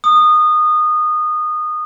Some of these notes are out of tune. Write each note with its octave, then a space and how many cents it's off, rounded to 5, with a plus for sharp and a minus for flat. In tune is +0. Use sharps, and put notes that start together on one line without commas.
D#6 -20